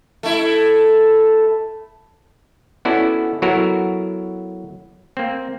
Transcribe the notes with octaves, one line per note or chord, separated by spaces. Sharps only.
A3 E4
B3 C#4 E4 F#4 A4 D5
F#3 B3 E4 F#4 A4 A#4
A#3 C4